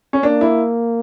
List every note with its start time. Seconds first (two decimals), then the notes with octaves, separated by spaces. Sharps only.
0.13 C#4
0.23 A#3 D4
0.41 E4